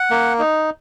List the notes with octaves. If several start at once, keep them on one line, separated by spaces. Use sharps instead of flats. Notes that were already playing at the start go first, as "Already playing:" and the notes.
Already playing: F#5
A#3
D#4